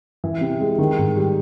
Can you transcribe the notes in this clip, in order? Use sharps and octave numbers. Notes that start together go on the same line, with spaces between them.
E3
C3
G#3
D#3
G#2
G3